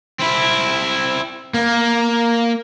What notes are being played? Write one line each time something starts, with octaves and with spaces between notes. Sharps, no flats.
C4 E4
A#3